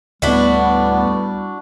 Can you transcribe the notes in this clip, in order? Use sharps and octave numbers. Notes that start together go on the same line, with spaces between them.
D2 A2 G3 B3 D4 E4 F#4